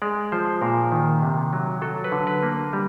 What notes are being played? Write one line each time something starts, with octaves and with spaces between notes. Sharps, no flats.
G#3 D5
F3 C5
A#2 A#4
D#3
C3
F#3
F#3 A4
B4
D3
B4
A#3
G3